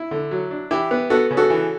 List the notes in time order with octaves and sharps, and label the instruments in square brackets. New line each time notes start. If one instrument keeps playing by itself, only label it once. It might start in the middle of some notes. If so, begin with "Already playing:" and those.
Already playing: [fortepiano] E4
D3
F#3
D4
E3 E4 G4
B3
B3 F#4 A4
C#3
F#4 A4
E3